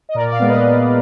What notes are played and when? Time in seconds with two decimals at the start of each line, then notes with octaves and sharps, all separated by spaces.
0.09 D#5
0.15 A#2 A#4 D5
0.31 D5 F5
0.39 G#3 B3
0.49 B4 D#5